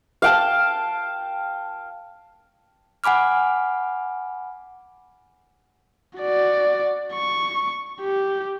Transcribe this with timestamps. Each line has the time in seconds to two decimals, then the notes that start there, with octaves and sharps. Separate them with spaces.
0.22 F5 G5 A5
3.04 F#5 G#5 B5 D6 F6
6.18 F#4 D5
7.14 C#6
8.01 G4